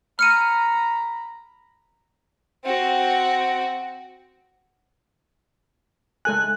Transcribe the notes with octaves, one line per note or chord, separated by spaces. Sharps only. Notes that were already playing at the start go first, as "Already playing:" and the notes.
A#5 B5 F6 C#7 D#7
C4 F#4
G#3 A4 G#5 F#6